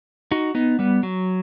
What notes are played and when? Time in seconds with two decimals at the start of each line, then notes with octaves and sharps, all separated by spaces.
0.31 D#4 F#4
0.55 B3 D#4
0.79 G3 B3
1.03 F#3